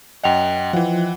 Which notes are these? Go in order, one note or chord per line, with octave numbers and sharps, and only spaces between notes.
F#2 D#5 F#5 G5 F7
E3 F3 E4 F4 F#5